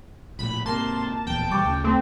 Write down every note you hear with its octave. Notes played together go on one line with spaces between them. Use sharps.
A#1 A2 B5
G#2 C3 A#3 A5 C6
D1 A#1 E2 G5
B2 E3 G3 C#6 D6 A6
D2 C#3
A3 C4